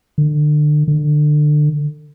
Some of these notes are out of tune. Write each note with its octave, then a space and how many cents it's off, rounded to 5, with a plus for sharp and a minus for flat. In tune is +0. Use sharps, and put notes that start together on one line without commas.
D3 +30
D3 +25